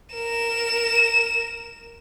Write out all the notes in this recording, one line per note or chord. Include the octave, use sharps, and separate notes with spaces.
A#4 E7